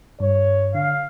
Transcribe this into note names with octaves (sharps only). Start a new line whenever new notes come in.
G2 C#5
D3 F5